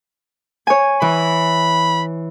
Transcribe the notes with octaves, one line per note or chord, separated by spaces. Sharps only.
C#5 G#5
E3 B5